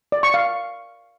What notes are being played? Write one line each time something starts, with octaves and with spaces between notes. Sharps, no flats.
D5
C#6
F5